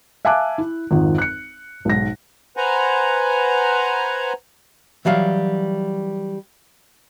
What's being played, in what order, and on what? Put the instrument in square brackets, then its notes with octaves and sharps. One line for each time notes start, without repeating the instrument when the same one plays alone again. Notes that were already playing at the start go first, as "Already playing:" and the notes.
[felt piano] E5 F5 G#5 A5 D6 F#6
E4
G#1 F2 D#3 F3
F#6 C#7
B1 G#2 A#6
[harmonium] B4 C5 F#5 G#5 A#5
[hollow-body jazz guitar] E3 F#3 G3 F5